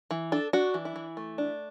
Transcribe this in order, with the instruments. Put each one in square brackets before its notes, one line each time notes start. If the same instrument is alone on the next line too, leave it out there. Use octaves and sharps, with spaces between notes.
[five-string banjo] E3
D4 A4
D4 F#4
E3
E4
E3
A3
D4